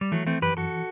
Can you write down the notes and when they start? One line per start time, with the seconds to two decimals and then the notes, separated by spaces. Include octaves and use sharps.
0.01 G3
0.12 E3 F#3 A3
0.27 A3 C4
0.42 F#2 G4 B4
0.57 F#4 A4